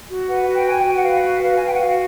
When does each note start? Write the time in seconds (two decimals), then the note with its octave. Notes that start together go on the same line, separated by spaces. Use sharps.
0.09 F#4
0.28 B4 F#5
0.47 F#4
0.53 G5
0.66 B4 G#5
0.79 G5
0.85 F#4
0.97 F#5
1.04 B4 F5
1.23 F#4
1.43 B4
1.58 G#5
1.61 F#4
1.66 G5
1.73 F#5
1.81 F#4 F5